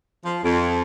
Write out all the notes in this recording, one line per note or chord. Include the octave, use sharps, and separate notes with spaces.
F3
F2